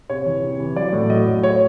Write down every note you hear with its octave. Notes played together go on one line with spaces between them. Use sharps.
C3 C#5
E3
C3
E3
F#3 D5
A2
F#3 D#5
A2
C#5